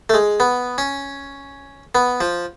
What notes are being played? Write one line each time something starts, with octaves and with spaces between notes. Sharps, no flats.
A3
G#3
B3
C#4
B3
F3